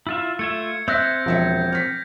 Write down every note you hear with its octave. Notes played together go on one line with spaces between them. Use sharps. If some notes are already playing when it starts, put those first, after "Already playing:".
E4 F4 E5
A3 F4 E5 G#6 C#7
C4 E5 E6 F#6 G6 A#6
E1 F3 E5 C#7
F6 B6